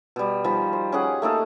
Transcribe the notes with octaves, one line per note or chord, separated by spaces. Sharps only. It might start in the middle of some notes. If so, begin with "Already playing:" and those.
B2 G3
D#3 F3 G3
C5
C#4 G4 G#4 F#5
A3 A#3 D#4 A4